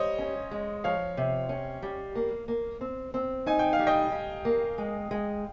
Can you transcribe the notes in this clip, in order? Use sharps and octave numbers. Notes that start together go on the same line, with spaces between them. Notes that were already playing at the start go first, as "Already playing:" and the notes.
Already playing: G3 C5 C#5 D#5
C#4
G#3
F3 C#5 F5
C3
C#4
G3
A#3
A#3
C4
C4
D#4 G#5
G5
F5
G3
D#5 G5
G3
A#3
G#3
G#3